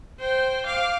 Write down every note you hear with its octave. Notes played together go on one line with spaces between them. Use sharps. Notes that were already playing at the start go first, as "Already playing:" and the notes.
C5 G5
F5 D6